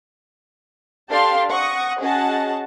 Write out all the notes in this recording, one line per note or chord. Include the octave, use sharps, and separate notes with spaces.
D4 G4 A4 F5 A5 C6
F#5 C#6 D#6 A#6
C#4 F#4 G#4 D#5 F#5 A5